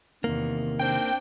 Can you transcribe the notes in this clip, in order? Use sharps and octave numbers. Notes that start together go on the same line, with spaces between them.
E2 C3 D#3 A#3
C4 D4 G5